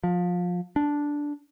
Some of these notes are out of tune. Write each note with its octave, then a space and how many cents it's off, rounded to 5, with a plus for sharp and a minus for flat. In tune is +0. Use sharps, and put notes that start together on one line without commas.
F3 +25
D4 -5